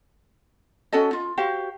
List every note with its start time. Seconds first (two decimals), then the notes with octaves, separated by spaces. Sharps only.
0.93 C#4 F#4 A4 D#5
1.13 F4
1.37 F#4 G4 C5 F5